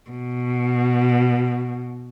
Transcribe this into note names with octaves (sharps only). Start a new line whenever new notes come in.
B2